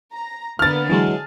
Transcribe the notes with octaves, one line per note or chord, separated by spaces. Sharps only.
A#5
D3 A#3 B3 F6 A6
E3 F#3 G#3 G#4 A5